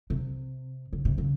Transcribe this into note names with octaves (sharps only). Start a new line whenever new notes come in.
C3
C#3
C3
C#3